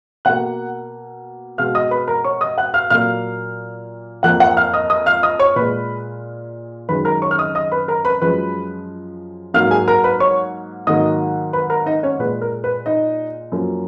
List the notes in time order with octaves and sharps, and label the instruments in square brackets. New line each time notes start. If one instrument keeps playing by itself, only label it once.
[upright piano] B2 A#3 F#5 F#6
B2 G#3 F5 F6
D#5 D#6
B4 B5
A#4 A#5
C#5 C#6
D#5 D#6
F#5 F#6
F5 F6
A#2 F#3 A#3 F5 F6
F2 F3 A#3 F#5 F#6
F#5 F#6
F5 F6
D#5 D#6
D#5 D#6
F5 F6
D#5 D#6
C#5 C#6
A#2 G#3 B4 B5
F#2 D#3 G#3 B4 B5
A#4 A#5
C#5 C#6
F6
D#5 D#6
D#5 D#6
B4 B5
A#4 A#5
B4 B5
F#2 F3 G#3 B4 B5
G#2 F#3 A#3 F5 F6
G#4 G#5
A#4 A#5
B4 B5
C#5 C#6
G#2 D#3 F#3 A#3 D#5 D#6
B4 B5
A#4 A#5
D#4 D#5
C#4 C#5
A#2 G#3 B4
A#4
B4
D#4 D#5
F#2 F3 A#3